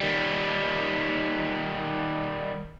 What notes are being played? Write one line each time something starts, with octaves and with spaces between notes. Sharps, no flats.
D#3 G3